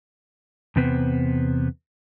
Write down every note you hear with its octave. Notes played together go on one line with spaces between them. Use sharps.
E2 C3 B3 C5